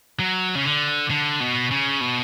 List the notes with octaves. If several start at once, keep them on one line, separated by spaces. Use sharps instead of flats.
F#3
C#3
D3
D3
B2
C#3
B2